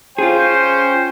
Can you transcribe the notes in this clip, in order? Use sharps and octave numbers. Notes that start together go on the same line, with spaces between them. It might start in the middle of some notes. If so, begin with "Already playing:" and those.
C#4 F4 G#4 C5 G5